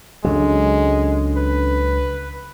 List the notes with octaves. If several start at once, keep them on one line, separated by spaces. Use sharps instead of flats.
C#2 F#3 G#3 C#4 D4 A4
B4